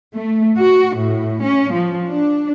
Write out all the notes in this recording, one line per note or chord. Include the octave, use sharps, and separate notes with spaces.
A3
F#4
A2
C#4
F3
D4